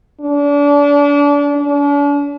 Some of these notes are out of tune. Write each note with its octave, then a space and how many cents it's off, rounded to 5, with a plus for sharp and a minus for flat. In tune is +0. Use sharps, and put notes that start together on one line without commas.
D4 -30
D4 -45